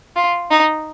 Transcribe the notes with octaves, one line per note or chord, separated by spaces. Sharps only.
F4
D#4